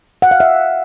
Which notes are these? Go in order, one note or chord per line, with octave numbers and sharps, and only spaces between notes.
F#5
F5
E5